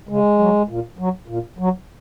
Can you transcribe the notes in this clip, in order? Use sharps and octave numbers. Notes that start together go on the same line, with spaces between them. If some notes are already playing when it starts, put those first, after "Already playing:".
C#3 G#3
F#3
A#2
F#3
A#2
F#3